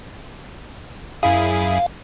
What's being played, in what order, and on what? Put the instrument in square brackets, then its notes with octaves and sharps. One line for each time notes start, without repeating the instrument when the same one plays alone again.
[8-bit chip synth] F#2 E4 G#4 [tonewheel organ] F5